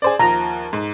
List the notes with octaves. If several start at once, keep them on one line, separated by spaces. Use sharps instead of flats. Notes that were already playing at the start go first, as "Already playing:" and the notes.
G#4 C5 D5
D#2 F3 A#5
G#2